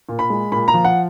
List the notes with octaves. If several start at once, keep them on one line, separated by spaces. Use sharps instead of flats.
A#2
B5
G#3
A#2 B5
A#5
F3
F#5